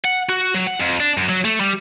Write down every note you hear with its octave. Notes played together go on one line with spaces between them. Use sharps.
F#5
F#4
F#3
F#5
F2
D4
F#2
F#3
A3
G3